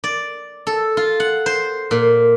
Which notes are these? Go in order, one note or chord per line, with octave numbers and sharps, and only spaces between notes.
D5
A4
F4
F#5
C5
A#2